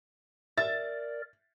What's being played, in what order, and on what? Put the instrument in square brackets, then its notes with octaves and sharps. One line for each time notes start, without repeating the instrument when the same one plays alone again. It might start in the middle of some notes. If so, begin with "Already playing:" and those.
[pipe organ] A#4 D5 [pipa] E5 [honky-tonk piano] A6